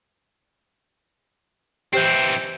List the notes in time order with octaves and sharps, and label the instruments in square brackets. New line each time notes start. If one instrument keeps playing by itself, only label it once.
[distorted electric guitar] E3 C4 [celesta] G4 C5 G6